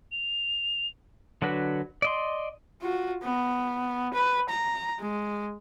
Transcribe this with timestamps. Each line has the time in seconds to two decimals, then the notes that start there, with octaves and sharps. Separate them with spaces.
0.12 F7
1.42 D3 F#3 D4 F#4 B4
2.02 D5 D#5 C6
2.82 F4 F#4
3.22 B3
4.14 B4
4.49 A#5
4.99 G#3